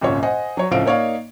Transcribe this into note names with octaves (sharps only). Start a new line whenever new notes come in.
G#1 C#2 F#2 A#2 C#5
C5 D#5 F#5 G#5
F#3 C#5
C#2 A2 F3 C4 F5 D7
A#3 D#4 C#5 D5 F5